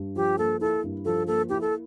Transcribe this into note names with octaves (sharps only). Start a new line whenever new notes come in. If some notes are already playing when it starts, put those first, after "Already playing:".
Already playing: G2
F3 G4
A#3 A4
E4 A4
G2
F3 A4
A#3 A4
E4 G4
A4